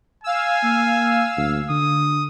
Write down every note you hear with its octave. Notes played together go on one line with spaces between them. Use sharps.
F5 G#5 E6
A#3
D2
D3 D#6